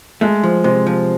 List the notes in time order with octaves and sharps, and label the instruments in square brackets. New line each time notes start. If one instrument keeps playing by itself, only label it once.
[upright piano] G#3 [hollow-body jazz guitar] A3
[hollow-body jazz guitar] F3
[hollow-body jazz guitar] C3 [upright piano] G#3
[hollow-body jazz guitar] F3